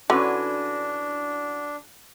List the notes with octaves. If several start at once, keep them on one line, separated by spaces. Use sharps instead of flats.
D3 C#4 D4 E4 F#4 B4